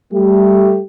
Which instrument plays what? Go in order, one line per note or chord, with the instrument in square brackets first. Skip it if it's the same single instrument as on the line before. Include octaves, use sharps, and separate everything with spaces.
[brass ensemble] G3 A3 G4